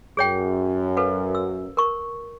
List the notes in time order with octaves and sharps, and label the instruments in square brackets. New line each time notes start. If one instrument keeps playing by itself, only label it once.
[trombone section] F#2 [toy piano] G#4 C#5 G5
[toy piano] A4 B4 F5
E6
A#4 C#6